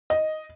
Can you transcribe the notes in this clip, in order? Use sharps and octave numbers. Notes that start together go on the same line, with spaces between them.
D#5